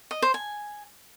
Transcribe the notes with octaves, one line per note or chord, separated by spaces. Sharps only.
D#5
C5
G#5